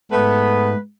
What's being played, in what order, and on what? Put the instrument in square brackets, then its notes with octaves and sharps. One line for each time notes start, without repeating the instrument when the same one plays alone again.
[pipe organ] G#2 [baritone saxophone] A3 [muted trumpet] B3 [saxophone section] B4